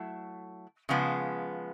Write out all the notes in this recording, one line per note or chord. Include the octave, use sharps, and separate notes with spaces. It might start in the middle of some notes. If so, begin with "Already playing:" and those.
Already playing: F#3 A3 E4
C#3 F3 G#3 B3